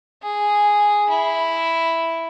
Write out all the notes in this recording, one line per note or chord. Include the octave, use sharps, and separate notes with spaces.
G#4
E4